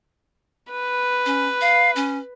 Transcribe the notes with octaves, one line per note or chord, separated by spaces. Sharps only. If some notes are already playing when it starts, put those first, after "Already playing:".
B4
C#4
F5
C#4